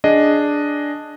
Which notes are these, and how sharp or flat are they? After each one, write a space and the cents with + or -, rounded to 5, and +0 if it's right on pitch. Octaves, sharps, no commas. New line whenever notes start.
D4 +0 G#4 +0 D#5 +0